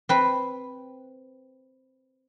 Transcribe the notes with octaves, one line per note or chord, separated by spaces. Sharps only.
C4 B4